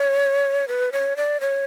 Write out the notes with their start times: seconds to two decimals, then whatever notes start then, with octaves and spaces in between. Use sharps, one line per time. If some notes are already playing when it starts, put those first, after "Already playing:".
Already playing: C#5
0.68 B4
0.92 C#5
1.17 D5
1.41 C#5